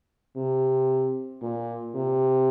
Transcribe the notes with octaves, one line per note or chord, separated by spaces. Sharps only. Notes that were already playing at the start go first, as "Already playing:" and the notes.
C3
A#2
C3